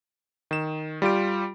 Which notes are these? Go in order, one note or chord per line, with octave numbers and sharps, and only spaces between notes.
D#3 E7
G3 F4 G4 D7